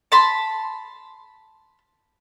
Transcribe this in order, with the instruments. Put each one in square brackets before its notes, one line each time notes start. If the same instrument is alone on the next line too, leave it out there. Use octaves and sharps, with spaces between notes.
[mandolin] A5 B5 C6